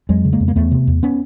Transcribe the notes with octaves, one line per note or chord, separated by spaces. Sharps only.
F2 F#3 G#3
C#3
G#3 A#3
F2
A#3
E2 A3 B3
C3
E2
B3 C#4